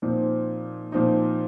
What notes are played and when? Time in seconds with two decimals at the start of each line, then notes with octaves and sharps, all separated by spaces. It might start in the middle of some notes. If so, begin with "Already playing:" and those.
0.02 A#2 F3 C4 D#4
0.92 A#2 F3 C4 D#4